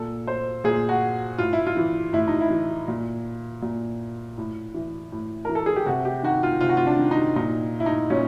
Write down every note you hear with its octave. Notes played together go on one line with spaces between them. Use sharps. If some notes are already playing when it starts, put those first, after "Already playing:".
Already playing: A#2 A4
C5
A#2 G#4
F#4
A2 F4
E4
F4
E3
A2 E4
D#4
E4
E3
A#2
A#2
A2
E3
A2
E3 A#4
A4
G#4
G4
C3 F#4
G4
D#3 F#4
F4
C3 F4
F#4
F4
D4
D#3
D#4
A#2 D#4
E4
D#4
A#2 C#4